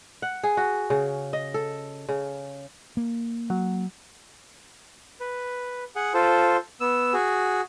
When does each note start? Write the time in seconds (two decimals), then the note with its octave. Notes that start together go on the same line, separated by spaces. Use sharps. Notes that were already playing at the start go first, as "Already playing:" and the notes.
0.22 F#5
0.43 G#4
0.57 F#4
0.90 C#3
1.33 D#5
1.54 A4
2.09 C#3
2.97 A#3
3.50 F#3
5.20 B4
5.96 G#4 F#5
6.14 F4 A4 C5
6.80 B3 E6
7.13 F#4 G#4